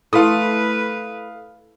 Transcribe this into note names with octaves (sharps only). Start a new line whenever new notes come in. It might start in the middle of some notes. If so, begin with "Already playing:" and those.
A3 E4 B4 F5 C6 D#6